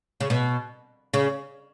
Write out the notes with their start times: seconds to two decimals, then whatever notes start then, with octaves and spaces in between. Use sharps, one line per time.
0.20 C#3
0.30 B2
1.14 C#3